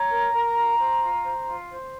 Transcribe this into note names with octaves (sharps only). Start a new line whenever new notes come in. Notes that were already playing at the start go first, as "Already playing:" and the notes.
Already playing: C#5 A#5
A#4
A#4
F4
C5
F4
C5
F4
C5